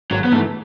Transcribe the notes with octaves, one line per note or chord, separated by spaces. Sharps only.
G#1 F#3
B3
G#2 E3 A3